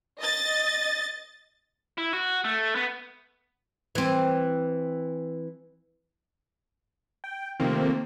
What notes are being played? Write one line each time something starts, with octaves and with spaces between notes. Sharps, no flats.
D#5 A6
E4
F#4
A3
B3
E3 C4
G5
C3 D#3 F3 A3 A#3 C4